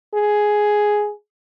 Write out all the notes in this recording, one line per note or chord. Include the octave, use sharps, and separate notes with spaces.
G#4